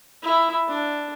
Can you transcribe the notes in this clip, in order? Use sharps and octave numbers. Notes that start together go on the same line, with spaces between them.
E4
D4